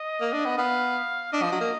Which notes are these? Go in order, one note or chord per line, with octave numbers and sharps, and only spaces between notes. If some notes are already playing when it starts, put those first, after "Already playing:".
Already playing: D#5
A#3
D4
B3
B3 F5
D4 D#5
F3
F#3
A#3